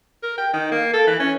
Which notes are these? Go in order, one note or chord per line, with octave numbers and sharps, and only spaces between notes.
A#4
G5
D#3
A#3
A4
E3
C#4